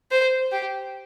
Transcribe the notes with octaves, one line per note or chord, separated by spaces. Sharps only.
C5
G4